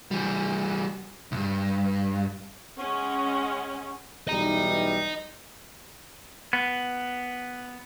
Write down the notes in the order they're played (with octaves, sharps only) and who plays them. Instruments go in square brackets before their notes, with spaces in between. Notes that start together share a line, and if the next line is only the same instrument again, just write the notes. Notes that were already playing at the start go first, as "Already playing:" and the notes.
[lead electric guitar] E3 G3
C2 G2
[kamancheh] G#3 F#5 [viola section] C#4
[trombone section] B1 E3 G3 [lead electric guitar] D#5 A#5
[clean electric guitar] B3